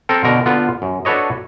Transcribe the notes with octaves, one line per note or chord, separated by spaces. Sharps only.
C4 A4 A#4
B2 D3 A#4
D3 B3 F4
F#2
D4 F#4 A4 B4 C#5 D#5